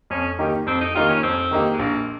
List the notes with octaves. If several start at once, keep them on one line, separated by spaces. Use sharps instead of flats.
F2 C#4
D#3 A#3 D#4 G4
F2 C4
D#4
D#3 A#3 D#4 F4 G4
C#4
F2 C4
D#3 A#3 D#4 G4
G#3
A#1 A#3